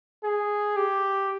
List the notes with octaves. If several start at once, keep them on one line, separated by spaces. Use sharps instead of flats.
G#4
G4